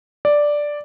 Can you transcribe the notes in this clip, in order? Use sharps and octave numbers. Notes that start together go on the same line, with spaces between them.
D5